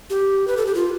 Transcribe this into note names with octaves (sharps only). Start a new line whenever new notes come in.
G4
B4
A4
G4
F4